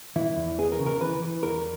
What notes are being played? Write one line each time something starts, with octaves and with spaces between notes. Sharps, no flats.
E3 E4
E2
B3 G#4
A#4
C#3
A#4
E3 B4
E3
E2 A#4